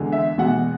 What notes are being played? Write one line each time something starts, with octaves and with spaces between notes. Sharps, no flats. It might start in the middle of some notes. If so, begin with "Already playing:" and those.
Already playing: E2 D3 G#3
E5
E2 B2 G#3 F#5